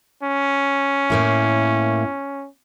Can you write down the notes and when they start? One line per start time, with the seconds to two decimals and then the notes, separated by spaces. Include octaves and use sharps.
0.23 C#4
1.10 A2 A#3 E4